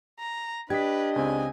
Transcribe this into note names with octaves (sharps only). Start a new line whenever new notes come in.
A#5
D4 G4 B4 D#5 G#6 B6
C#2 C#3 C4 G#5